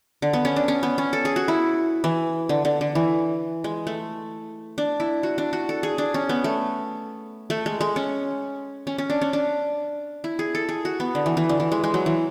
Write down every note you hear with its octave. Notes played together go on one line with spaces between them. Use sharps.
D3
B3
C#4
D4
C#4
B3
C#4
A4
G#4
F#4
E4
E3
D3
D3
D3
E3
G#3
A3
D4
E4
F#4
D4
F#4
A4
G#4
D4
C#4
B3
A3
A3
G#3
G#3
C#4
C#4
C#4
D4
C#4
D4
E4
G#4
A4
G#4
F#4
B3
D3
E3
E3
D3
E3
G#3
G#3
F#3
E3